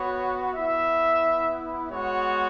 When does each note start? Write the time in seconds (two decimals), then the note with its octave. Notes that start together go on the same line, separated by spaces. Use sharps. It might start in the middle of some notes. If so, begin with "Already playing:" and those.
Already playing: B3 F#4 C#5
0.55 B3 E4 E5
1.90 G#3 B3 F#4 C#5